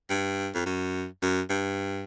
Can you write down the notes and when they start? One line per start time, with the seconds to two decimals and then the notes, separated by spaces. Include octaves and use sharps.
0.10 G2
0.54 F2
0.66 F#2
1.22 F#2
1.50 G2